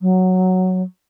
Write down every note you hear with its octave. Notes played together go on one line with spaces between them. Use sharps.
F#3